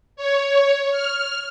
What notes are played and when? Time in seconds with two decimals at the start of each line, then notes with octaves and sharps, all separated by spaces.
0.16 C#5
0.91 F6